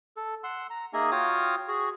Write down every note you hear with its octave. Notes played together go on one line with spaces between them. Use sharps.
A4
F#5 C6 E6
A#5
A#3 D#4 G#4 D#5 E5 G#5
F4 F#4 C#5 F5 G5 D#6
F#4 G#4